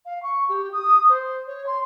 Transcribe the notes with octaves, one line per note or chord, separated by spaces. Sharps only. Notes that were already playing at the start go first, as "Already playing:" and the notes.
F5
C#6
G4
D#6
C5
C#5
C6